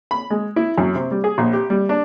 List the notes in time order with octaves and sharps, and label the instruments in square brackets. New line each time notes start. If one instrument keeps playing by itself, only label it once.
[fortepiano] B5
G#3
E4
F#2
C3
G3
G#4
A#1
G4
G3
D4